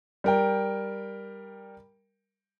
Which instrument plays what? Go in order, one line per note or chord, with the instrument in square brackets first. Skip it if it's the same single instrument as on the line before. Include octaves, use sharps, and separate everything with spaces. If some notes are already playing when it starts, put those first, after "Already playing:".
[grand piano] G3 A#4 G5